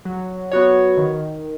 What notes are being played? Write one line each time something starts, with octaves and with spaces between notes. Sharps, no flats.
F#3
B3 F#4 C#5
D#3